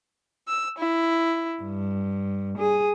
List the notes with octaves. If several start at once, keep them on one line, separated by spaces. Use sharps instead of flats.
E6
E4
G2
G#4